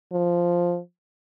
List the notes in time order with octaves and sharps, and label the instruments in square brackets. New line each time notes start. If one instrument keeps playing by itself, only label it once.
[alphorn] F3